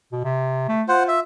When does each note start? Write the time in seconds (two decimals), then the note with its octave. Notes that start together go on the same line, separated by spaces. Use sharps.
0.12 B2
0.24 C3
0.68 A3
0.88 F4 C5 F#5
1.08 E5